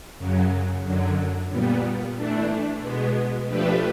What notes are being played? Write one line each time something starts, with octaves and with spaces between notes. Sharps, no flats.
F#2 C#3 F#3
F#2 D3 F#3
A#2 G3 B3
E3 A3 D4
B2 G#3 B3
F3 A3 D4 G4 B4